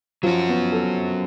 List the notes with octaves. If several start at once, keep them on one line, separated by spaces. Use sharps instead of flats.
F3 F#3 C#4 F#4
B3
A4